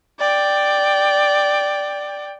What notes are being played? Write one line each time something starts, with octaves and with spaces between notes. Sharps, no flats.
D5 G5